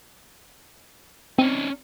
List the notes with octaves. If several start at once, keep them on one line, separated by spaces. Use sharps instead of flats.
C4 C#4 D#4